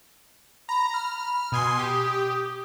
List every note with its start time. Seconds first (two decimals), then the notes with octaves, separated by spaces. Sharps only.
0.69 A#5 B5
0.94 B5 F6
1.52 B2 G#5 C6 D#6
1.79 G4